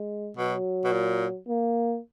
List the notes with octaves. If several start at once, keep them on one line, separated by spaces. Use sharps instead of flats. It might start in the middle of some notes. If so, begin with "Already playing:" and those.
Already playing: G#3
B2 F#3
B2
A#2
A#3